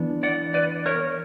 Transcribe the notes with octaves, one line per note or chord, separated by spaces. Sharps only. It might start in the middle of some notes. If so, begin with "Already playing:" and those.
Already playing: E3 B3 D4
D5 F#5
B4 D5
A#4 C#5